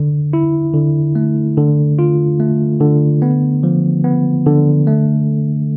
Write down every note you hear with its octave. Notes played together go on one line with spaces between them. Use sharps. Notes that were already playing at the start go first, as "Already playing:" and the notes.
Already playing: D3
E4
D3
A3
D3
F4
A3
D3
B3
F3
B3
D3
A3